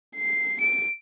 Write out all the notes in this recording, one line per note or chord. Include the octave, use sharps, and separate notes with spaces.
C7
D7